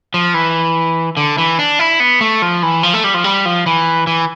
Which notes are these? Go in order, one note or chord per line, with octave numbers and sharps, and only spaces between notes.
F3
E3
D3
E3
D4
E4
B3
A3
F3
E3
F3
A3
G3
F3
G3
F3
E3
E3